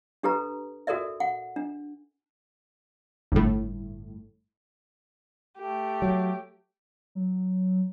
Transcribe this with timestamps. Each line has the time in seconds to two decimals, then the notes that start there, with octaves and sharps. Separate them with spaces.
0.23 D4 G4 A4 B4 A#5
0.87 F#4 A4 A#4 D5 E5
1.20 F#5
1.56 D4
3.32 G1 A2
5.59 A3 G4
6.02 F#3
7.15 F#3